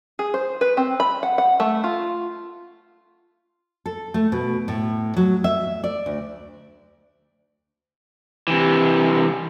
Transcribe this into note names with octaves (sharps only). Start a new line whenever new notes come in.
G#4
C5
B4
C4
B5
F#5
F#5
A3
F4
A4
A3
B2
A2
F#3
E5
D5
D2
C3 E3